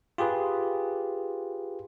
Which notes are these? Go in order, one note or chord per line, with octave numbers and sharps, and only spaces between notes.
F4 G4 G#4 B4